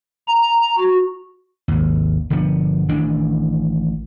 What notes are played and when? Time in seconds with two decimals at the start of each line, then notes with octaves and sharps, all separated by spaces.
0.28 A#5
0.78 F#4
1.68 G#1 D#2
2.30 G1 D3 F3 B3
2.88 A1 D#3 E3 D4